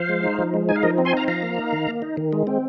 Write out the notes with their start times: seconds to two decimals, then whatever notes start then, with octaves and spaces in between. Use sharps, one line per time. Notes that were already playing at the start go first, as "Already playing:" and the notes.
Already playing: F3 C5 F5
0.09 G#3
0.23 D#4
0.39 F3
0.54 G#3
0.69 D#4 G#5
0.76 F5
0.83 F3 A#4 D#5
0.98 C4
1.05 G#5 C6
1.13 D#4 F5 A#5
1.28 F3 F5 A#5
1.43 A#3
1.58 D#4
1.73 D#3
1.88 A#3
2.02 D#4
2.17 D#3
2.33 G#3
2.47 C4